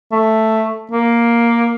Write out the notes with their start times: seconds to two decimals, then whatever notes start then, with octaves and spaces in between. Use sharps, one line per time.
0.12 A3
0.92 A#3